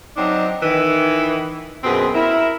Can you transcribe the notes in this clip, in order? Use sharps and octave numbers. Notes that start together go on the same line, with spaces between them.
F#3 C4 D4 D#4
D#3 E3 B4
F#2 B2 C4 G#4 B4 C5
E4 A#4